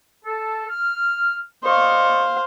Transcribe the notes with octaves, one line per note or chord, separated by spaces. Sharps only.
A4
F6
C5 D5 D#5 F5 C#6